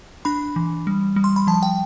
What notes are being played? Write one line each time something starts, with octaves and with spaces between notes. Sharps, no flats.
D4 B5
E3
G3
G3
C6
B5
F3 A5
G5